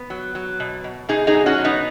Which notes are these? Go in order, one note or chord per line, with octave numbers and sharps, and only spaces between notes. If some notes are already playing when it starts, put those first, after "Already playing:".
Already playing: B3
F#3
F#3
B2
B2
B2 D#4 G#4
D#4 G#4
F#3
C#4 F#4
B2
B3 D#4